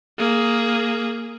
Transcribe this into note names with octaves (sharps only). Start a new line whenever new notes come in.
A#3 G#4